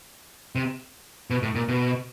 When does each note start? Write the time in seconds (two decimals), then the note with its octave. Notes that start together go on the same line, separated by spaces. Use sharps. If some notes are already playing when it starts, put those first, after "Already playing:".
0.55 C3
1.30 B2
1.42 A2
1.55 A#2
1.68 B2